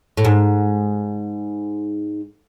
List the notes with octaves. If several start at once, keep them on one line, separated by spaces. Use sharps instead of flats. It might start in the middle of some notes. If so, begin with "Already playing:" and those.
A2
G#2